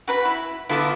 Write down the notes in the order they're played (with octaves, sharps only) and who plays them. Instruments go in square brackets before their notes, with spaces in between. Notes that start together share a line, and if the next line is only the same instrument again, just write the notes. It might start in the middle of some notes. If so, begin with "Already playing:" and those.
[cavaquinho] F#4 B4 B5
E4
[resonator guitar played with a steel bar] D3 B3 F4 [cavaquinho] E4 A4 D6